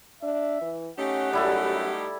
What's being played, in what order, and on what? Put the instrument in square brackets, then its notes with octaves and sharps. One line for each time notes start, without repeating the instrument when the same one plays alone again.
[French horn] D4 [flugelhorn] E5
[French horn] E3
[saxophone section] A3 D#4 G4 [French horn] C#4 [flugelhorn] F#5
[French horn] F#2 [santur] G3 E4 A4